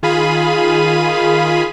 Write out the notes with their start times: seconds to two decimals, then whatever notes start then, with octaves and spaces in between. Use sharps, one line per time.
0.03 D#3 F4 G#4 F5 B5 D#7